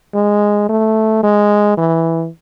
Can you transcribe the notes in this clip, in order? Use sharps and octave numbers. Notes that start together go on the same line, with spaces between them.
G#3
A3
G#3
E3